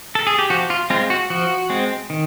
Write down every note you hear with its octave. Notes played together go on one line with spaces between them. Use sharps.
A4
G#4
G4
F3 F#4
F4
G#3 C4 F4
F#4
F3 F#4
G#3 C4
D#3